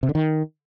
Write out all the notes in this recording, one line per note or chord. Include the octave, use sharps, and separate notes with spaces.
C3
D3
D#3